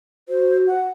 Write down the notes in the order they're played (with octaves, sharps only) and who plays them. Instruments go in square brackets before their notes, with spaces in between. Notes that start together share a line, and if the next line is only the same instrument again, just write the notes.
[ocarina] F#4 [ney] C5
[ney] F#5